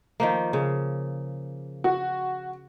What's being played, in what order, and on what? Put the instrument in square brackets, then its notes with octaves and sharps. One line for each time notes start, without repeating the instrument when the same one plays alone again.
[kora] D#3 F3 A#3
C#3
[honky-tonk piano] F#4